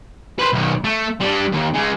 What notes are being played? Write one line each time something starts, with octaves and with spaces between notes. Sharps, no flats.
B4 C5
B1 D#3
A3
G3 D4
D#2
C#3 G#3